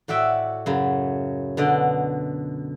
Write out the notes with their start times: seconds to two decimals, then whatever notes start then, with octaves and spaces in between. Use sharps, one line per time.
0.08 A2 F#4 D5 E5 G5
0.66 F#2 C#3 F#3
1.57 B2 D3 D5 D#5